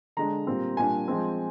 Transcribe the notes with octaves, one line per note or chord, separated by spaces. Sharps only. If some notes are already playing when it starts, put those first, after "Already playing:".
D3 G#3 D4 A#5
A#2 G3 C4
A#2 G3 D4 G#5
F3 G#3 C4